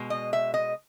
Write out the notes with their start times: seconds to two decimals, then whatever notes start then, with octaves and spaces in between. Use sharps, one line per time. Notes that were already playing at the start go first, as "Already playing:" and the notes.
Already playing: B2 G#3
0.10 D#5
0.33 E5
0.54 D#5